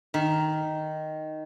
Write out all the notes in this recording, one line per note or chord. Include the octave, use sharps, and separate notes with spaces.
D#3